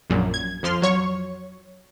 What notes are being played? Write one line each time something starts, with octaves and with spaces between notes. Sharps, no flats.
A#1 F#2 A#2
G#6
F2 F3 C6 F6
F#3 C#5 C#6